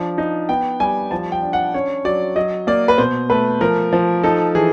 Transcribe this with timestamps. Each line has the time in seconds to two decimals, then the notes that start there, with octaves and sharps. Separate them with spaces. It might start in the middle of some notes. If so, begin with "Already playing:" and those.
Already playing: F3 D4
0.18 D#4
0.49 B3 G5
0.80 G3 G#5
1.11 F3 A5
1.32 G5
1.42 D4
1.53 F#5
1.74 C#4 C#5
2.05 F#3 D5
2.36 F#3 D#5
2.67 A#3 D5
2.88 B4
2.98 B2 C5
3.30 A3 B4
3.61 F3 A#4
3.93 F3
4.24 D#4 A4
4.55 E3 G#4